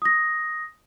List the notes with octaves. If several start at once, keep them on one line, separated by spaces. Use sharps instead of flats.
D#6 A#6